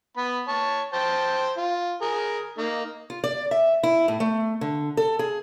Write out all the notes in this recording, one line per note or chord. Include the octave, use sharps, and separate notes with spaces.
B3 B5
C#5 A5
C5 G5 A5
F4
G#4 A#4
A#3 D#4
F4
D5
E5
E4
A2
A3
D3
A4
G#4